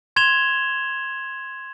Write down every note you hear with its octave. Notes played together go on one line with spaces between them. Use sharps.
C6 G#6 E7 F7 G7